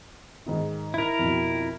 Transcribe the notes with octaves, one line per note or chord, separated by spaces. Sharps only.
G#2 D#3 D#4
E4 A#4
F2 B2